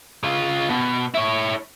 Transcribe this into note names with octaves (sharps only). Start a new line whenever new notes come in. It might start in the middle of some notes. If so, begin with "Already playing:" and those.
C#3 F4
B2
E4 C#5